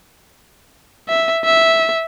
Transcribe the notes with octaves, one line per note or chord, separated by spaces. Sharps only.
E5
E5